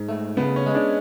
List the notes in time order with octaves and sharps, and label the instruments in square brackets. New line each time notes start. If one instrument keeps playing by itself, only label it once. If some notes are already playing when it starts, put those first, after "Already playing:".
Already playing: [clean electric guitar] G#2
A3
[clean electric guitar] C#3 [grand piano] B3
[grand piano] C#4
[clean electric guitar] G#3
[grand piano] D4